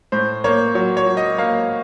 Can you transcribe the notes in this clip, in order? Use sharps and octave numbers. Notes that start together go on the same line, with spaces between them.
A2 C5
A#3 C#5
F#3 C#5
C#5
F#3
D#5
A#3 F5